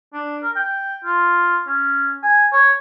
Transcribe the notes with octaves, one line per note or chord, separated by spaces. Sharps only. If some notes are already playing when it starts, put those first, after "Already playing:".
D4
A#4
G5
F4
C#4
G#5
C#5